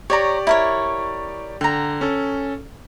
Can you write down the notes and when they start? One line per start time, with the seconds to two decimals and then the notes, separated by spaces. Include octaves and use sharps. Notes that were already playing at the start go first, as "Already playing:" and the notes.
0.10 G4 C#5 D5 A#5 C#6
0.47 E4 A#4 C#5
1.61 D3 G5 A#5
2.01 C#4 A4